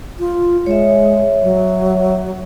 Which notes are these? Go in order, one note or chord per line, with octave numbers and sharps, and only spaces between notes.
F4
G#3 C#5 E5
F#3